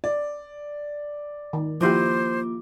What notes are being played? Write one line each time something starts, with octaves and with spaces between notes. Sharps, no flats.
D5
D#3
F3 A#3 E4 F4 G4 C5 D6